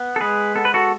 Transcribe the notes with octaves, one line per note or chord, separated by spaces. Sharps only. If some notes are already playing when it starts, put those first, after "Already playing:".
Already playing: B3
A4
G#3 G#4 B4
B3 A4
B4
F#4 A4